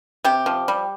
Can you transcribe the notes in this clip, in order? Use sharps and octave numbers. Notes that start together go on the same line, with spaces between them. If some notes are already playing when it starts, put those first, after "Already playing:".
C3 G4
F3
G3